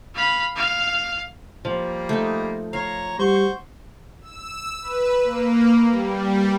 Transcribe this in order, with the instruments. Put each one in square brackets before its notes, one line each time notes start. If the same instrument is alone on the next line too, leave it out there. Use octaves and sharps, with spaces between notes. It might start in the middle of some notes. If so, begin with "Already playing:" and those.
[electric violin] F5 B5
F5
[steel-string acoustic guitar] F3 [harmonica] G3 A#3
[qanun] A3 D#4
[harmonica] C#5 A#5 [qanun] F5
[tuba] G3 [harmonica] F#4 C5 C#6
[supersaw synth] E6
B4
A#3
G3